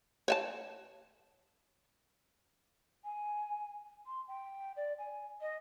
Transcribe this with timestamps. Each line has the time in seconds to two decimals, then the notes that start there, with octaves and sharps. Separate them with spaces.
0.28 C#5 E5 A5
3.04 G#5
4.06 C6
4.28 G5
4.76 D5
4.98 G#5
5.41 D#5